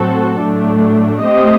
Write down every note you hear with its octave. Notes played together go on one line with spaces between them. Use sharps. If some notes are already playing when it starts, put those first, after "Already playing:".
Already playing: A2 F#3 C4 F#4 A4
A2 F#3 A3 D4
A3 C4 G4 C5 D#5